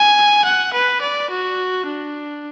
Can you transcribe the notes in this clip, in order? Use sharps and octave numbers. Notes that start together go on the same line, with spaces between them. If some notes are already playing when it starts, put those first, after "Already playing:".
Already playing: G#5
F#5
B4
D5
F#4
D4